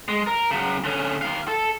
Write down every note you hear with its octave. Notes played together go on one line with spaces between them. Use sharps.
G#3
A#4
C#3 F#3
D3 C#4
D#3 F5
A4